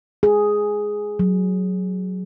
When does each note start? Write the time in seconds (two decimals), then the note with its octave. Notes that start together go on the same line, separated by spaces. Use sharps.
0.23 G#4
1.19 F#3